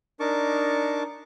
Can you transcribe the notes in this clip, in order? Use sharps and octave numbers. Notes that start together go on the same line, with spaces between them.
D4 D#4 A#4 A5 C#6 D6